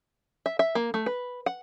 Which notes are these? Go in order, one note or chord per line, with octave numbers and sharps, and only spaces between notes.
E5
E5
A#3
A3
B4
F#5